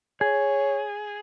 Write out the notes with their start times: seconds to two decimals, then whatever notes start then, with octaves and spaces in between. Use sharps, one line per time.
0.21 G#4 C#5